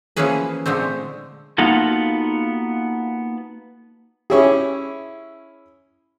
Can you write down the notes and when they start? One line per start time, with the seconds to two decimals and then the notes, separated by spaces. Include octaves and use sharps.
0.16 E3 F3 A#3 C#4 G#4 B4
0.66 A#2 D3 G#3 A3 C4
1.58 A#3 B3 D#4 F4 F#4 A4
4.30 C#4 E4 G4 G#4 C#5